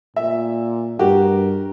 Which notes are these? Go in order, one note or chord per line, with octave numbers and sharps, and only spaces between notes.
A#2 E5
G2 F#4 G4 A#4